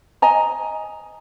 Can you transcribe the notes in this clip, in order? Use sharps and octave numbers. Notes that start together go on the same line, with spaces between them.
D#5 G#5 A#5